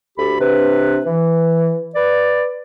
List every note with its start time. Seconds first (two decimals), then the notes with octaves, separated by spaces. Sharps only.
0.18 D2 G4 A4 B5
0.40 C3 D4 B4
1.06 E3
1.95 B4 D5